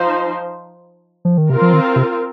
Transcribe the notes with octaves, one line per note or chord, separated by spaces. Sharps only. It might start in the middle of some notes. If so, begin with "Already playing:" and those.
Already playing: F3 D#4 C5
F3
D#3
C3 C4 F4 A#4
F3
D#3
C3